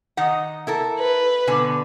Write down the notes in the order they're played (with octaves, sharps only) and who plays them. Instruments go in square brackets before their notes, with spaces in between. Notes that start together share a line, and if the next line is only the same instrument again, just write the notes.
[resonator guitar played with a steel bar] D#3 D#4 F#5
E4 A4 A#4
[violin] B4
[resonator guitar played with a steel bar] B2 D3 G#5